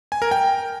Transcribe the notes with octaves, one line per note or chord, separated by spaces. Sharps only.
G#5
A#4
G5